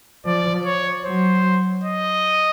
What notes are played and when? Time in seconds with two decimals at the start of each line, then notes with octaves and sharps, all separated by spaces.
0.26 F3 D5
0.65 C#5
1.05 F#3 C5
1.84 D#5